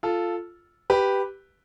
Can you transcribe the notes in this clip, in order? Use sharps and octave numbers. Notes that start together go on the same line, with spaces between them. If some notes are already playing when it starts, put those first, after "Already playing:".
F4 A4
G4 B4